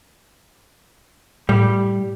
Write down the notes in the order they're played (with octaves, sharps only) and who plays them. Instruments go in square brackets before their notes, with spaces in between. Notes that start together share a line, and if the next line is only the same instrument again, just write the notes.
[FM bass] A2 [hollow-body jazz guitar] G3